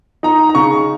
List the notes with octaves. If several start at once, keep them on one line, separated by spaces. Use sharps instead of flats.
D#4 A#5
A#5
C#3 C#6